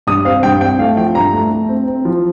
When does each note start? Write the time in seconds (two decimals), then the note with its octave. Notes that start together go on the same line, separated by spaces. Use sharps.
0.07 G2 D#6
0.25 C4 F5
0.43 G2 G5
0.61 C4 G5
0.79 A3 F5
0.97 F3 G5
1.15 G2 A#5
1.33 A3
1.51 A3
1.69 C4
1.87 C4
2.05 F3